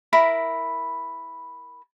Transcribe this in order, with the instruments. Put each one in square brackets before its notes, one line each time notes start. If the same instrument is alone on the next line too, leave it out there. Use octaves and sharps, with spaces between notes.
[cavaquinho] E4 A#4 B5